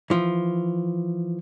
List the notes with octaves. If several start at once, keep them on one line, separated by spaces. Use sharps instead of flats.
E3 F3